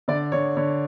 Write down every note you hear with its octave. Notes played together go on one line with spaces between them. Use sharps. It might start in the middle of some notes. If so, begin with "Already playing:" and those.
D3 D5
D3 C#5
D3 C#5